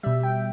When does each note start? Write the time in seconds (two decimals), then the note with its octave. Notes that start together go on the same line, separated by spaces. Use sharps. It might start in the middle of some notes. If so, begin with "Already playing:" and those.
0.03 B2 G3 E5
0.23 G5